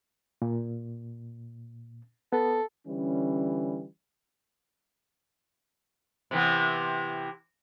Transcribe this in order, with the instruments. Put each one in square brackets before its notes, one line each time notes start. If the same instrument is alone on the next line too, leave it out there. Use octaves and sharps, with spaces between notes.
[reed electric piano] A#2
[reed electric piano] B3 [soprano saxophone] A4
[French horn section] D3 E3 G3 C#4
[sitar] C3 E3 B3